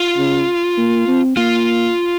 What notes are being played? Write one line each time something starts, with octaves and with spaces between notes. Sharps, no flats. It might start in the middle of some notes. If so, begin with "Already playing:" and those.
Already playing: F4
C#3
A#3
C4
A#3 F4